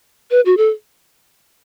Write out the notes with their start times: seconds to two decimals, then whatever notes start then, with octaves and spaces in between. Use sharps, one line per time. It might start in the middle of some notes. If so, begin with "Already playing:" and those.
0.31 B4
0.46 F#4
0.57 A4